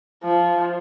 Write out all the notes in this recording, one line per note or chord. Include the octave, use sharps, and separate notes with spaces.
F3